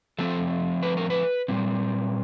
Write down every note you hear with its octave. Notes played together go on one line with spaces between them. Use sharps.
F3 A3 C4 A4
B4
A#4
B4
A#2 G3 C4